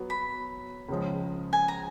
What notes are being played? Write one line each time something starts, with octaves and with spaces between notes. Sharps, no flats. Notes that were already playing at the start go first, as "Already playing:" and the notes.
Already playing: F#3 B3 F#4
B5
C#2 C#3 F3 G#3
G#5
A#5